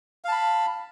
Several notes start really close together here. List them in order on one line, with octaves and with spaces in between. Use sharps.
F5 A5 B5